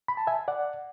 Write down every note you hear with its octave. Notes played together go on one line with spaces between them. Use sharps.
B5
A5
E5 G#5
D5 F#5